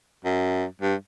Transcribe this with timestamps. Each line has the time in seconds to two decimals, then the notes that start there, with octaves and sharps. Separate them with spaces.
0.25 F#2
0.82 G2